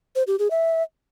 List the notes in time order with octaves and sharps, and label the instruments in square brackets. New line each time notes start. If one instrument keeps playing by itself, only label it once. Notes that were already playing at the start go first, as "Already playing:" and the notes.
[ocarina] C5
G4
G#4
E5